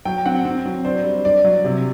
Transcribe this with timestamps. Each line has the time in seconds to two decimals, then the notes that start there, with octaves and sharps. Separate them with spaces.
0.05 F#3 G5
0.26 C4 F#5
0.45 C4
0.66 F#3
0.85 D4 C5
1.04 G3
1.25 D4 D5
1.45 F#3
1.64 C3